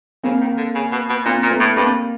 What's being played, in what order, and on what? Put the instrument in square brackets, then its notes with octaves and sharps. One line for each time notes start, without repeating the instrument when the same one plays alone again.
[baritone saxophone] C#3 [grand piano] A#3 C4
[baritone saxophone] D#3
D3
C#3
B2
B2
[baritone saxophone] A#2 [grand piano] A#3 C4
[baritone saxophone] A#2
[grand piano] A3 B3
[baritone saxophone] A2
[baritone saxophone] G2 [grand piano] A#3 C4